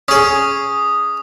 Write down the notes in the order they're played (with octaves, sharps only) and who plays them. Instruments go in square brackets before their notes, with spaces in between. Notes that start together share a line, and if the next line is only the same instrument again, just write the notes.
[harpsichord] C#4 G#4 [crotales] D#6